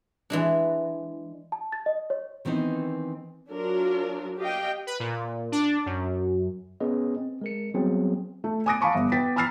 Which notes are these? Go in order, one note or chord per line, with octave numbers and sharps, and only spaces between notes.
E3 G#3 D4
A5
A6
D#5
C#5
D#3 E3 B3 C4 D#4
F#3 D4 F4 A#4
G4 D#5 F5 G5
B4
A#2
D4
F#2
B3 C#4 G#4 B4 D#5
C4
G#3 A#4 C#7
F#3 G3 B3 C4 G#4
A3
G#5 D6 D#6 F#6 A#6 D7
F5 G#5 A5 B5 C#6 D6
G1
B3 G5 A6 B6
A#5 B5 E6 F6 A6 C7